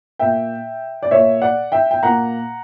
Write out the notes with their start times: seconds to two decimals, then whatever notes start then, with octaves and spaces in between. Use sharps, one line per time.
0.19 A#2 A#3 E5 G5
1.03 D5
1.11 A#2 A#3 C#5 E5
1.42 D5 F#5
1.72 E5 G5
1.91 G5
2.03 A#2 A#3 F#5 A#5